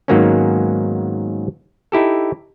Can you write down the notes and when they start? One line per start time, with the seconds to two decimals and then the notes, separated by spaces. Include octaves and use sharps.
0.08 G#2 D#3 F#3 A#3 B3 C#4
1.92 D#4 E4 G4 A4